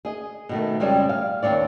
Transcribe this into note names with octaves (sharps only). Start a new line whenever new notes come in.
G#4 D#5
B2 D#3 A3
F2 C#3 G3 G#3 C4
F5
D#2 C4 C#5 D5